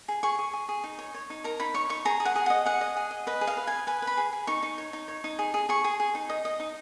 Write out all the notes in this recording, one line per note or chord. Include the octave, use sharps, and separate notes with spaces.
G#4
G#4 C#6
G#4
G#4
G#4
D#4
C#5
C#5
D#4
A#4 A#5
D#4 B5
C#5 C#6
D#4 C#6
G#4 A#5
G#4
F#5
G#4
D#5 F#5
G#4 F#5
D#5
G#4
D#5
B4 D#5
G#4
F5
B4
B4 G#5
B4 G#5
B4
B5
G#4
G#4
D#4 C#6
D#4
C#5
D#4
C#5
D#4
G#4
G#4
G#4 C#6
G#4
G#4
D#4
D#5
D#5
D#4